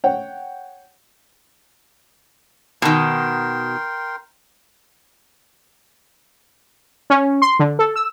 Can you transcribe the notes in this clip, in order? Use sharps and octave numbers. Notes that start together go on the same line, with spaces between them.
C#5 F#5 G5
B2 D#3 A#4 G5 C6
C#4
C6
D3
A4
E6